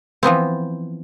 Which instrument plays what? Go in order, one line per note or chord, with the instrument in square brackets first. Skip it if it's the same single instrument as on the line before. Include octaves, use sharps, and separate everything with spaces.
[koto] E3 F3 B3 C4